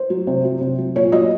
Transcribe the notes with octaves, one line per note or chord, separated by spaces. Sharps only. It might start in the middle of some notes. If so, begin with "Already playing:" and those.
Already playing: C5
F#3
C3
F#3
C3
F#3
A#2 C#5
F#3 D#5